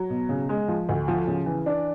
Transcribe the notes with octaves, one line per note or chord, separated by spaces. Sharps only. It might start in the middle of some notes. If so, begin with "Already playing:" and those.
Already playing: F#3
B2
C#3
G#3
F3
D2
F3
C#3
E3
D4